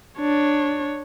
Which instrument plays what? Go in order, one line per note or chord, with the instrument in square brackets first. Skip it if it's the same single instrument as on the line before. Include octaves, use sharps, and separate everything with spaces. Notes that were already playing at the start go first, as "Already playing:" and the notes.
[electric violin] D4 C#5